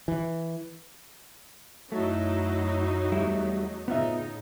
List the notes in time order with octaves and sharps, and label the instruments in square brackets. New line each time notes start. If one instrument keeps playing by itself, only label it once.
[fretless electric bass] E3
[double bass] F#2 E4 [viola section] F#3 D#4 [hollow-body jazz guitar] A3
[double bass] E2 A3 [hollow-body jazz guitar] G3 E4
[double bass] A2 C#3 [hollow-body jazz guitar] B3 F4 E5 [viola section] D#4